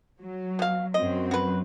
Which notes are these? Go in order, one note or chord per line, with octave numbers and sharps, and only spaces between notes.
F#3
B2 F5
F#2 F#3 C4 D#5
F#4 B4